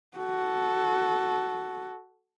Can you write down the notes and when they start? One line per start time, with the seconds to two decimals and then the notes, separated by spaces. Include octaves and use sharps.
0.17 F#4 A4